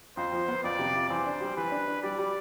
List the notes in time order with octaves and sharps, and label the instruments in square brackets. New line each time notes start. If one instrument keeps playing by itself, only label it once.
[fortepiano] F2 [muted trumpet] C5
[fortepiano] F3
B3
[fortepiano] F2 [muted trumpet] D5
[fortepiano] C3
F2
[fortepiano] E3 [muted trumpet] C5
[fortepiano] D4
G3
[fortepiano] E3 [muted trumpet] B4
[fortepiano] D4
D4
[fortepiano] G3 [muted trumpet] D5
[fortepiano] G3